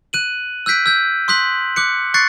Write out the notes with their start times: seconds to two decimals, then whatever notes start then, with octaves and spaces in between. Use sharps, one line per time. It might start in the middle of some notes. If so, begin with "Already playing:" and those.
0.13 F#6 D#7 F#7
0.66 E6 F#6 G6 B6 D7
0.86 E6 G6
1.28 C6 D#6 F#6 B6 F#7
1.76 D6 F#6 C#7
2.14 C#6 F#6 A6 C7 C#7